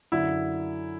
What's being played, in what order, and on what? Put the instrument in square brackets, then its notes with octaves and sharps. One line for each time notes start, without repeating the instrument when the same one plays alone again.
[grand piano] F#2 D3 E4